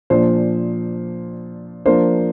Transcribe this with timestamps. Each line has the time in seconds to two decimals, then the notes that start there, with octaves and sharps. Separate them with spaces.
0.10 A#2 F3 D4 C5
1.86 F3 A#3 D4 C5